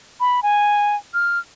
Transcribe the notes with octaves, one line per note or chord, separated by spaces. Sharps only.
B5
G#5
F6